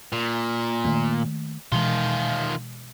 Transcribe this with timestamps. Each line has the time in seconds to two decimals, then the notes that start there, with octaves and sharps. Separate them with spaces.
0.12 A#2
0.85 D#3 A3 A#3
1.72 B2 D#3 E3 G#3 F4